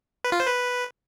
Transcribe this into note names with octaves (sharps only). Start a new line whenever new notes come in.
B4
F4
C5
B4